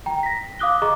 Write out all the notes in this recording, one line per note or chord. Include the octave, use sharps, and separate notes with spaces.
G5 A#5
A#6 B6
F5 D6 D#6 F#6 G7
G#4 D#5 A#5 C#6 D6